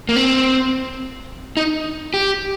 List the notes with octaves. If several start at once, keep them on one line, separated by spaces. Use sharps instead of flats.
A#3
C4
D#4
G4